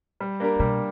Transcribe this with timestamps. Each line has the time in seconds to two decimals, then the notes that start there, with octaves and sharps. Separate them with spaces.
0.20 G3
0.40 A#3 D4 G4 A#4
0.59 B2 G3